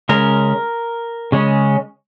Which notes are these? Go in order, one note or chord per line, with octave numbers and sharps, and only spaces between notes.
C#3 G#3 C#4 A#4
C#3 G#3 C#4